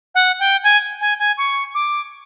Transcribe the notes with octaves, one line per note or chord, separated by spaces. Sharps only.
F#5
G5
G#5
G#5
G#5
C#6
D6